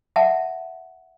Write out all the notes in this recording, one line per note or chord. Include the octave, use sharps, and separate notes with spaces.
E5 F#5 A5